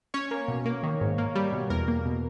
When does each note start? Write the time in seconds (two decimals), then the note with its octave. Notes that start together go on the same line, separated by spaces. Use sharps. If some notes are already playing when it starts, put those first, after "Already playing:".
0.14 C#4 C#5
0.31 A#3
0.48 B2
0.66 A#3
0.83 D#3
1.01 G#2
1.18 A#3
1.35 G3
1.53 B2
1.70 E2 A#4
1.88 A#3
2.05 B2